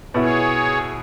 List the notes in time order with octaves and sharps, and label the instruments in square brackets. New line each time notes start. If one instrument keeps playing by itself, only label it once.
[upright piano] B2 B3 E4 [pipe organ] G#4 C#5